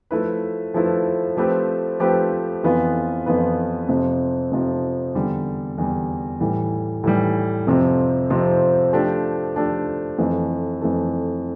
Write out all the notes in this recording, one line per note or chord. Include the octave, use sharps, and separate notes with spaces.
F3 A3 E4 B4
F3 A3 E4 B4
F3 A3 C4 G4 B4
F3 A3 C4 G4 B4
F2 E3 B3 F4 B4
F2 E3 B3 F4 B4
F2 C3 F3
F2 C3 F3
E2 D3 G3
E2 D3 G3
A2 E3 G3
A2 E3 G3
F2 C3 F3 C4
F2 C3 F3 C4
F3 A3 D4 G4
F3 A3 D4 G4
F2 E3 A3
F2 E3 A3